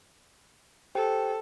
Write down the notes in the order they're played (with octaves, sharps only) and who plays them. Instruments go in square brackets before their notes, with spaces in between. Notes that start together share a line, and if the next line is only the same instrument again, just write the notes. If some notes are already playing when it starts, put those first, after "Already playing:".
[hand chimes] G4 C5 G5 [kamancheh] A4